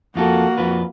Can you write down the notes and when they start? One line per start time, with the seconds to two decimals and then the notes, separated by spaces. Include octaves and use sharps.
0.16 F2 A#3 F4 F#4 A4
0.58 F2 F4 B4